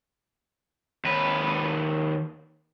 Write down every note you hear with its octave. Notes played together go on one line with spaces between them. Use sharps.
D#2 B4